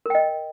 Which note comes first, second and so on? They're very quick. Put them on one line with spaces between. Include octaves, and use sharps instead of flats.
A#4 G5 D#5